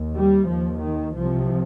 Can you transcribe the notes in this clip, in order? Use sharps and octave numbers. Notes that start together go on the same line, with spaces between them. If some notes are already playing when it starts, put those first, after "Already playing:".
Already playing: D#2
G3
D#2 F3
D#3
C2 C3 F3